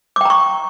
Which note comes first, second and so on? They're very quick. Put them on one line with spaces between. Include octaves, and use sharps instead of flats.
D6 G5 A#5 C#6